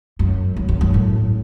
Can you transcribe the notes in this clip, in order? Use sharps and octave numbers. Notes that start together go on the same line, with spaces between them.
F#2
F#2
F#2
F#2
A2